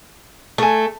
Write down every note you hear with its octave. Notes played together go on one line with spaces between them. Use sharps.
A3 A4 G#5